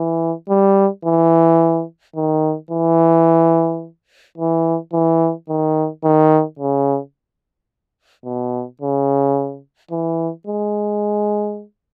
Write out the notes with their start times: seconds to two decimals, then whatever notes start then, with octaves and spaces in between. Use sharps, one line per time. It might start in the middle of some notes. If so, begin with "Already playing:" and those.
Already playing: E3
0.49 G3
1.05 E3
2.16 D#3
2.71 E3
4.38 E3
4.93 E3
5.49 D#3
6.04 D#3
6.59 C#3
8.25 B2
8.81 C#3
9.91 E3
10.47 G#3